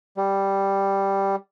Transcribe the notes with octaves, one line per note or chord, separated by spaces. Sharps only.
G3